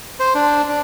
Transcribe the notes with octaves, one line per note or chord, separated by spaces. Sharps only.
C5
D4
D4